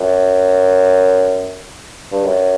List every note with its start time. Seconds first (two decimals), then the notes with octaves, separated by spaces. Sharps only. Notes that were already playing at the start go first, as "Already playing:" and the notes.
Already playing: F#2
2.12 G2
2.24 F#2